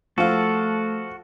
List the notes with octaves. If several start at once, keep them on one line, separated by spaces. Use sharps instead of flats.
F3 A3 F4 F#4 A4